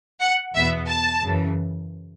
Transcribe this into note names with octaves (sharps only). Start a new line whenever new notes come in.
F#5
E2 B2 B3 E5
A5
F#2 C#3 E3